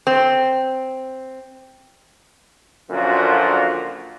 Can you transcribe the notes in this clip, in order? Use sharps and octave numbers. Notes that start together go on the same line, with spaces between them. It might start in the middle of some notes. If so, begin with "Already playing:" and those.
C4
F#2 A#2 D3 F3 F4 F#4